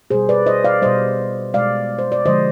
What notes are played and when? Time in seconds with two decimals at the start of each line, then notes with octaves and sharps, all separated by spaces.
0.10 B2 G3 G#4 C5
0.29 B4 D5
0.47 C5 D#5
0.64 D5 F5
0.82 B2 G3 C5 D#5
1.54 B2 G#3 D5 F5
1.99 C5
2.12 D5
2.25 D3 F3 G#3 C5 D#5